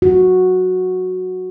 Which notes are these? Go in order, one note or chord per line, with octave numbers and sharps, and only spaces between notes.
F#4